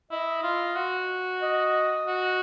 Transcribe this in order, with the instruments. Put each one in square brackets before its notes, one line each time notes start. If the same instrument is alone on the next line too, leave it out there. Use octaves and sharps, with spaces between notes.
[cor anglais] E4 [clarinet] D#5
[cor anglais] F4
F#4
[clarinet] D#5
[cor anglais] F#4